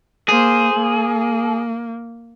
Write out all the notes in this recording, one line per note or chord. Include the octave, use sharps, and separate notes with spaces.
A#3 G#4 C5
A#3